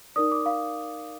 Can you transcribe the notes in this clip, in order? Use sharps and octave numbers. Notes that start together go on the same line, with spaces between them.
D#4 A#4 D5 D#6
D6
F5